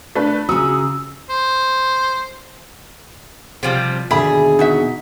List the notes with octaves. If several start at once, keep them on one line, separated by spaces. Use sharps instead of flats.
A3 D4 B4
C#3 F#4 A#5 D#6 E6
C5
C3 F3 G3
D#2 B2 D3 G#4 E5 B5
D#4 F#4 E5